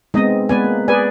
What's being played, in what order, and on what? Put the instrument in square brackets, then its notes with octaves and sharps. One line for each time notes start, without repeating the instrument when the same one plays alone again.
[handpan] G#3 B3 C4 [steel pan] D#4 D#5
[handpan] G#3 B3 B4 [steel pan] D5 G#5
[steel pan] A#3
[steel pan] G#4 B4 G#5 [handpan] D5